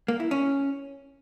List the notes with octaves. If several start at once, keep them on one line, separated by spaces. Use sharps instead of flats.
A#3
E4
C#4